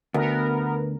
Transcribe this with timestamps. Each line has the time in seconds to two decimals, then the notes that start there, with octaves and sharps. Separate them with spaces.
0.14 D2 B3 A#4